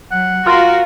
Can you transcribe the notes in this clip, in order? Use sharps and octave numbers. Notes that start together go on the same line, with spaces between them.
F#3 F#5
F4 F#4 A#4